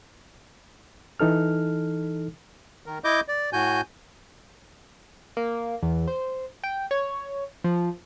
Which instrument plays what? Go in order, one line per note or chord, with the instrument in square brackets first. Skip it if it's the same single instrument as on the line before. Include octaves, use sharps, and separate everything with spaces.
[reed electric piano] E3 D#4 A4 F6
[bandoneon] D#3 A#4
E4 D#5 D6 G6
D5
A2 F#4 G#5 G6
[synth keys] A#3
E2
C5
G5
C#5
F3